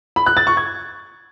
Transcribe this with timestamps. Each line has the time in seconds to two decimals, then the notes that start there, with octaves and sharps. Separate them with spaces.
0.16 B5
0.26 F#6
0.37 A6
0.47 C#6
0.57 G#6